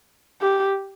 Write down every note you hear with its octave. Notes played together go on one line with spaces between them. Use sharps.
G4